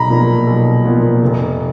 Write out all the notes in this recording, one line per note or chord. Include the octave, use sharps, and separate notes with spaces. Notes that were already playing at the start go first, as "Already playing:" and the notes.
Already playing: B1 A#5 B5
A#2 F3 B3
B1
A#2 F3 B3
F1